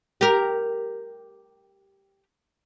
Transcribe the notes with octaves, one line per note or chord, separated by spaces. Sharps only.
G4 A#4